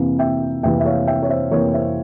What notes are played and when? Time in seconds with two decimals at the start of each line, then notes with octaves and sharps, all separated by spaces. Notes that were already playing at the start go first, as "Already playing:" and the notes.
Already playing: F2 C3 E3 A#3
0.19 E5 G5
0.63 F2 C3 E3 A#3 E5 G5
0.80 E5
0.85 C#5 F5
1.07 E5 G5
1.23 C#5
1.29 C5 E5
1.51 F2 C3 E3 A#3 A#4 C#5
1.73 C5 E5